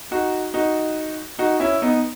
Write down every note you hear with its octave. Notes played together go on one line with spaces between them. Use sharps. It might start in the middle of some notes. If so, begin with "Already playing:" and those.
D#4 F#4
D#4 F#4
D#4 F#4
C#4 E4
B3 D#4